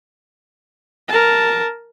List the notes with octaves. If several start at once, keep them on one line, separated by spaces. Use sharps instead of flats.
A#4 A5